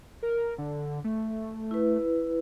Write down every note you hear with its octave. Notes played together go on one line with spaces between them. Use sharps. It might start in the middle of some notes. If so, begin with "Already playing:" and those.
A#4
D3
A3
E4 B4